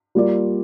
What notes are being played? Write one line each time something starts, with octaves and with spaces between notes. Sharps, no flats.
G3 A#3 F4 D5